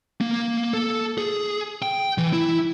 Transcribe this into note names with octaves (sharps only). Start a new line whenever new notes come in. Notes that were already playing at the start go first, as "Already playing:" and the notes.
A#3
A4
G#4
G5
E3
E4